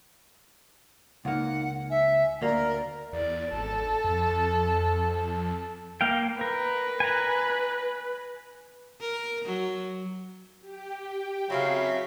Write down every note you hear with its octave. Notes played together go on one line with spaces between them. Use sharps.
C#2 A#3 D#4 F#5
E5 G#5
D2 A#3 A#4 D5
E2 D5
G#1 A4
F2
A#3 F5 G5
A#4 B4
G#5 A#5
A#4
F#3
G4 G5
C#3 F#3 C4 E4 F5 B6